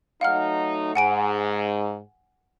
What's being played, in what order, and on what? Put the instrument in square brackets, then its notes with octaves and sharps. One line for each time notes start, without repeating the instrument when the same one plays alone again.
[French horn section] F#3 A3 D#4 [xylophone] F5 F#5 F6
[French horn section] G#2 [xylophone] F#5 G#5 D7